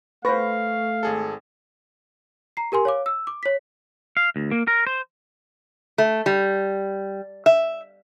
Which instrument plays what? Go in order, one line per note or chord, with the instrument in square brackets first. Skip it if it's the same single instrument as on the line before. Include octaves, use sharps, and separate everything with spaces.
[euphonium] A3 [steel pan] B4 C5 [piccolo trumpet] F5 [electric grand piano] C#6 A#6
[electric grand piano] G#1 G#4 A4
[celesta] A#5 C7
G4 A#4 G#5 C6
C#5 F5 D6
E6
D6
C#5 B6
[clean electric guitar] F5
D2
A#3
A#4
C5
[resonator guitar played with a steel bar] A3
G3
E5